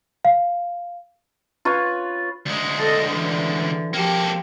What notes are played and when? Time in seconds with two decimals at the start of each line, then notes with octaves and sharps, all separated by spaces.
0.25 F5
1.65 F4 B4 C#5
2.46 D2 G#3
2.78 A4 D#5
3.07 D3 E3
3.94 F3 A#3 G4 A4